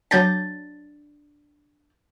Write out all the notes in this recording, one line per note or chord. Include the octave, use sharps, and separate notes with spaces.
F#3 D4 A5 G6 A#6